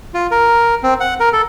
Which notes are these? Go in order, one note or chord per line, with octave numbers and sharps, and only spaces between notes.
F4
A#4
C4
F#5
A#4
A4